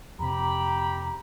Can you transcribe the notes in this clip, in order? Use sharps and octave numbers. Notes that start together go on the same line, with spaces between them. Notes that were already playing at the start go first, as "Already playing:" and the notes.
F2 C3 G4 A#5 B5